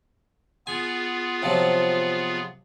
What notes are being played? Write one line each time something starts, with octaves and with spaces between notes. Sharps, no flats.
B3 F4 G#4 G#5
C3 F3 F#3